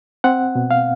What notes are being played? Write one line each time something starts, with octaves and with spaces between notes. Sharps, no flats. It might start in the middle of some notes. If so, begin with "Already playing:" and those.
C4 F#5
B2
F5